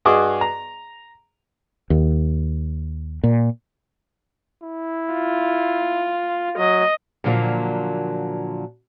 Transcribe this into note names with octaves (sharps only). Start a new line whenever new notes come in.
G2 F#4 G#4 D#5 D6
A#5
D#2
A#2
E4
F4
F#3 D#5
A#2 D3 F3 F#3 A3 A#3